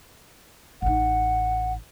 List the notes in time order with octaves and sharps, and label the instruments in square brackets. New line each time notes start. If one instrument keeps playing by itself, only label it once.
[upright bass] A1 D#4 [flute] F#5